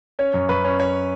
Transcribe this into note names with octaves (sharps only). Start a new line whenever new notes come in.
C#4 C#5
F#2
F#2 B4
C#4
C#4 C#5